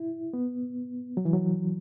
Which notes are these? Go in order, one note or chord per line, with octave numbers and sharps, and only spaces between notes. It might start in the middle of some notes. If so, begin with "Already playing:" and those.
Already playing: E4
B3
F#3
E3
F#3